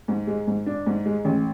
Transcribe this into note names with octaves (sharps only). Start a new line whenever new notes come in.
G#2
G#3
G#2
D4
G#2
G#3
A1